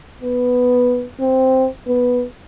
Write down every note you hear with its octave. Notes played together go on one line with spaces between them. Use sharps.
B3
C4
B3